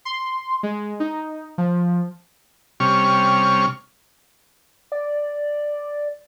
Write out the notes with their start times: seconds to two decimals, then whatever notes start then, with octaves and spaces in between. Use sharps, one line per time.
0.05 C6
0.63 G#3
1.00 D#4
1.58 F3
2.80 C3 G3 C#4 C#6 F6
4.92 D5